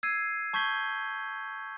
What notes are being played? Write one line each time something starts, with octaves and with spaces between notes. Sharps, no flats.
E6 G#6 C7 D#7
A5 C#6 G6 G#6 B6 G7